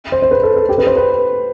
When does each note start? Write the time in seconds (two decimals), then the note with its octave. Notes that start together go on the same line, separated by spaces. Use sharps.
0.12 C5
0.22 C5
0.31 B4
0.43 A4
0.56 A4
0.69 G4
0.78 B4
0.87 C5
0.96 B4